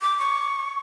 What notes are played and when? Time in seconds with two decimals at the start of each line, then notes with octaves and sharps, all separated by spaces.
0.01 D6
0.19 C#6